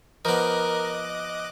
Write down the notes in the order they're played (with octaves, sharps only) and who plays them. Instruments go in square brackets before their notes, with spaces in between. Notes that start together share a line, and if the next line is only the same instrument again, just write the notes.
[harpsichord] F3 B3 [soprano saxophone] A#4 [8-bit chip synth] D#5 D6 F#6